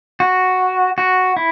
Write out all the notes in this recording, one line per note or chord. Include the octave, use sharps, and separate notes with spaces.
F#4
F#4
E4